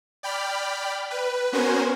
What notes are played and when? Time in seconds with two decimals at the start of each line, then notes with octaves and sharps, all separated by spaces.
0.23 D5 G5 B5 F6
1.11 B4
1.52 B3 C#4 F#4 A#4 C5 G#5